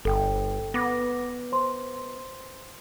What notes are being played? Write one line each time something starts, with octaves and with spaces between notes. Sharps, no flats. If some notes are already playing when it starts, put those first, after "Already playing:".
G1 A4 G5
B3 D6 A#6
C5 C6